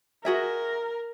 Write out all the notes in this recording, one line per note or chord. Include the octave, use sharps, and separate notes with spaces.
F#4 G#4 A#4 E5